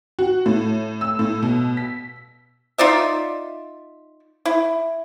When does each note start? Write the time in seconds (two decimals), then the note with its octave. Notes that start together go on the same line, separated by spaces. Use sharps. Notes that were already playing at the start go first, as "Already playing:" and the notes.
0.19 F#4
0.46 A2
1.01 E6
1.19 A2
1.43 B2
1.77 B6
2.78 D#4 F4 D5 E5
4.46 E4